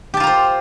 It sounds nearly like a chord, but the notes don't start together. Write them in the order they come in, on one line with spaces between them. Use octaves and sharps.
G4 A5 F4 A#5 C5